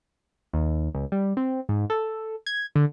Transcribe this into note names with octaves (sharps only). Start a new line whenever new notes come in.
D#2
C#2
G3
C4
G#2
A4
G#6
D3